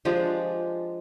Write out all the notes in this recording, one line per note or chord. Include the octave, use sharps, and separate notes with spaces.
F3 G#3 D4 G4